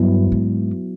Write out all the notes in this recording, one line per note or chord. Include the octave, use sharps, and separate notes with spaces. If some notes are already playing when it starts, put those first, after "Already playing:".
Already playing: G2 F#3 B3 E4
G#2